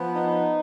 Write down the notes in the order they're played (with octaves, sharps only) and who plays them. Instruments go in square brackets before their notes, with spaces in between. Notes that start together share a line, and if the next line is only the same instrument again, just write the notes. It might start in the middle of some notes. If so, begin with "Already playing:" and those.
Already playing: [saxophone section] F3 B3
D#4